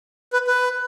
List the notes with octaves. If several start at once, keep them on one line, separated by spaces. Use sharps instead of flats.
B4
B4